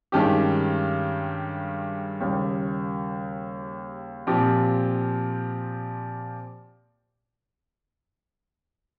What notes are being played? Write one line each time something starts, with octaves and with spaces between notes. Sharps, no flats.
G2 D#3 G#3 C#4 G4
D#2 C#3 G3 A#3
A#2 F3 C4 G4